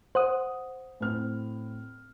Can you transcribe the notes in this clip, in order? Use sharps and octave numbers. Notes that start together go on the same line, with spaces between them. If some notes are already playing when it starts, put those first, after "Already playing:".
C5 F#5 D#6
A2 C4 F6